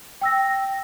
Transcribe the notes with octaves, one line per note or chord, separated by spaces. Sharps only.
G5 E6 A#6